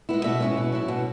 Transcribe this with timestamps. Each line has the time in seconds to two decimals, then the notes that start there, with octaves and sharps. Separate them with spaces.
0.09 G#3 B3 E4
0.24 B2 E5
0.40 G#3 C#4 E4
0.57 B2
0.72 F#3 E4
0.88 B2